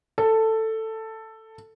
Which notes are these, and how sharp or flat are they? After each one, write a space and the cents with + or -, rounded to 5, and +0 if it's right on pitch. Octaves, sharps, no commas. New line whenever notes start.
A4 +10